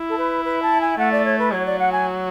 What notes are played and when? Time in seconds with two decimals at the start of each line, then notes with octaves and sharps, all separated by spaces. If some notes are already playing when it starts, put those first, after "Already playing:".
Already playing: E4
0.09 A4
0.18 B4
0.45 B4
0.62 A5
0.81 G#5
0.98 A3 F#5
1.12 D5
1.25 C#5
1.39 B4
1.52 F#3 C#5
1.66 D5
1.79 F#5
1.92 G#5